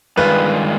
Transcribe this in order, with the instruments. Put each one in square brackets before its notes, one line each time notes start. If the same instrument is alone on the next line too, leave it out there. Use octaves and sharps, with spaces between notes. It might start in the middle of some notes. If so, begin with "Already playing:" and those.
[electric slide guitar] G2 D#3 G#3 F4 [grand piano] B4